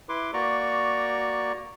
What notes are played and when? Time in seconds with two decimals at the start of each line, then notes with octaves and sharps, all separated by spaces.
0.09 E4 B4 C6 D6
0.34 A#3 F#4 D5 A#5 C#6